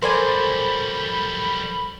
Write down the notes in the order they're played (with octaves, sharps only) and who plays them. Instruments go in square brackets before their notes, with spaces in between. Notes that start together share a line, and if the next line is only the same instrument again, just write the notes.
[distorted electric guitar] F#3 G3 [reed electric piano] A4 A#4 [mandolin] C5 D5 G#5 [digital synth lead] B5